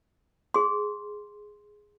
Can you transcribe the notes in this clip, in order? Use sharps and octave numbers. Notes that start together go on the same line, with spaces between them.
G#4 C6